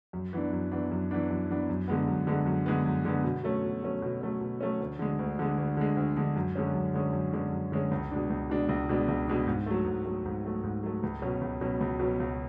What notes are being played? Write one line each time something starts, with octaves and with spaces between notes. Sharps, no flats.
F#2
E3 B3 D4
F#2
E3 B3 D4
F#2
E3 B3 D4
F#2
E3 B3 D4
F#2
D3 G#3 B3
F#2
D3 G#3 B3
F#2
D3 G#3 B3
F#2
D3 G#3 B3
B2
F#3 A3 C#4
B2
F#3 A3 C#4
B2
F#3 A3 C#4
B2
F#3 A3 C#4
D2
D3 G#3
D2
D3 G#3
D2
D3 G#3
D2
D3 G#3
F#2
D3 G#3 C#4
F#2
D3 G#3 C#4
F#2
D3 G#3 C#4
F#2
D3 G#3 C#4
C#2
B2 G#3 D4
C#2
B2 G#3 D4
C#2
B2 G#3 D4
C#2
B2 G#3 D4
G#2
F#3 A3
G#2
F#3 A3
G#2
F#3 A3
G#2
F#3 A3
C#2
B2 F#3 C#4
C#2
B2 F#3 C#4
C#2
B2 F#3 C#4
C#2